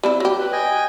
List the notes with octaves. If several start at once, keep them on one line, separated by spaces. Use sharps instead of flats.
G3 C4 E4
F#3 G4
B4
D#5 G5 G#5